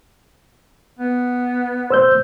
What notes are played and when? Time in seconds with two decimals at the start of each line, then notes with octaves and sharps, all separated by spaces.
0.99 B3
1.90 C5 E6 G6